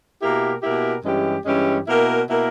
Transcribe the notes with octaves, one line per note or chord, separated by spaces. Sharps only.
B2 A#3 E4 G4 A#4
B2 A#3 E4 G4 A#4
G2 E3 G#3 C#4 G4
G2 E3 G#3 C#4 G4
B2 A#3 E4 A#4
B2 A#3 E4 A#4